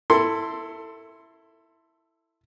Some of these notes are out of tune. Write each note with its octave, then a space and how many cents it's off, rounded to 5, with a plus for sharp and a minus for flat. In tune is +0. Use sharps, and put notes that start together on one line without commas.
E4 +0 A4 +20 C6 +0